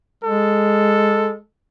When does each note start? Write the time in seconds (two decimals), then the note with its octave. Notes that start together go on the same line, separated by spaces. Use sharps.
0.24 G#3 A4